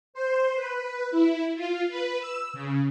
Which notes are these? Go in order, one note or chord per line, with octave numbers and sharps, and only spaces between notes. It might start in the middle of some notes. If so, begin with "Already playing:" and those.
C5
B4
E4
F4
B4
E6
C#3